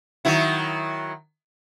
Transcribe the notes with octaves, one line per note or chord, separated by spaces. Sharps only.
D#3 F#3 E4